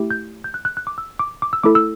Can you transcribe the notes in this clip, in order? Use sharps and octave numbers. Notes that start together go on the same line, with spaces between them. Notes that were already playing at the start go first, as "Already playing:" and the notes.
Already playing: A3 E4 G4
G6
G6
F#6
F#6
F#6
D6
E6
D6
D6
E6
A3 E4 A4 D6
E6